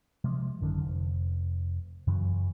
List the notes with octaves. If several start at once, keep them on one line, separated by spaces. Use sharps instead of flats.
C3 F3 G3 G#3
G#1 F#2 D3 D#3
F1
F#2 C#3 E3 F#3